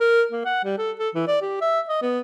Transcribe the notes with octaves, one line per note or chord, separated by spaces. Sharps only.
A#4
A#3
F#5
G3
A4
A4
E3
D5
G4
E5
D#5
B3